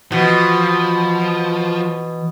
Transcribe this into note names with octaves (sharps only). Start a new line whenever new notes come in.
B2 E3 F3